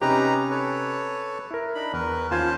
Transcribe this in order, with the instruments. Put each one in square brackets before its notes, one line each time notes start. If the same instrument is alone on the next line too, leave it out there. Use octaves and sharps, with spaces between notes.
[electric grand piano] C3 C#4 G4 [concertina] D#4 B4 A#5
[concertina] A4 B4 C#5
[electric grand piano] E4 A#4
[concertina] D4 D#4 B5
[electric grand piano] E2 [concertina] A#4 B4
[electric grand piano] D#2 F4 G#6 [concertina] C#4 C5 A5